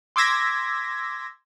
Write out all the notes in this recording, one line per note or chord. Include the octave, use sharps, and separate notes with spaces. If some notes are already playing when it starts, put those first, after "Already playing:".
C6 D6 E6 G#6 A#6 B6